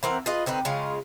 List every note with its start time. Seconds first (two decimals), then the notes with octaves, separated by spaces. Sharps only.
0.03 E3 C4 A#4 F#5
0.26 F4 G#4 B4 D#5
0.46 D3 C4 D#4 B4
0.65 C#3 G#3 F4